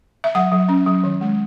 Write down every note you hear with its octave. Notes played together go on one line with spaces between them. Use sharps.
E5
F#3 F#5
F#3
C#4
F#3
D#3
G#3